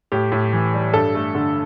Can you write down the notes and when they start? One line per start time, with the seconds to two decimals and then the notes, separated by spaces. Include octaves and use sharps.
0.12 A2 G4
0.32 A2
0.53 E3
0.74 G3
0.94 G2 A4
1.15 A3
1.35 D3